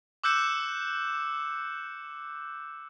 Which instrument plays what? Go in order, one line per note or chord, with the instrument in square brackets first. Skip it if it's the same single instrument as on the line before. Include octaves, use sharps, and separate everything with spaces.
[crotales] D6 E6 F#6 G6 C#7 E7